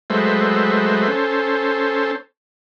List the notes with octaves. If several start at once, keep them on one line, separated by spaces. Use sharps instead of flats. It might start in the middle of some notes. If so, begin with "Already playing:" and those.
F#3 G#3 A3 B4 C5 E5
C#4 A4 C5